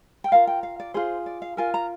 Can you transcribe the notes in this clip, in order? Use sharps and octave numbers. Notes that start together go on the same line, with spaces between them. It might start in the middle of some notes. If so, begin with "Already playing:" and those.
G5
F4 A#4 F5
G5
F5
D5
F4 G#4 C5
D5
F5
F4 A#4 G#5
A#5